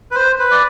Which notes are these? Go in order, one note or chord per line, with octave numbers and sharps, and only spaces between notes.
B4
C5
B4
D5